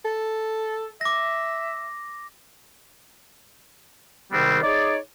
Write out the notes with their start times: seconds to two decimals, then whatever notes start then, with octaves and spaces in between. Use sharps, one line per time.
0.05 A4
1.01 E5 D6 A#6
4.32 G#2 C3 D#3 G3 B3 C4
4.63 D#4 G#4 C#5 D5